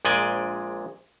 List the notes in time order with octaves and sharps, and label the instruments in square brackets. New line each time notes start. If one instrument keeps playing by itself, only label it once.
[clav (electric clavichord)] A#1 A#2 G#3 D5 G5 G#5